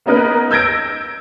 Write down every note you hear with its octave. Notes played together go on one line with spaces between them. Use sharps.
A#3 B3 C#4 D#4 A#4 B4
E6 G6 G#6 A#6 D7